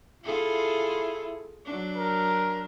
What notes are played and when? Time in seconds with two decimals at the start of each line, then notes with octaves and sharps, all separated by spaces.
0.24 E4 F4 G#4 A4
1.65 F#3 D4
1.96 A#4